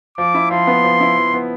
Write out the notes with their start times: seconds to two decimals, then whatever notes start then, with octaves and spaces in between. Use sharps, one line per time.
0.18 F3 D6
0.35 E4
0.51 F3 C6
0.67 B3
0.84 F3
1.01 E4
1.17 F3
1.34 B3